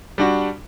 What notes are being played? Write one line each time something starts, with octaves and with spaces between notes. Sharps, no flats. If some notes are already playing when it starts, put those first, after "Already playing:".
G3 D4 F#4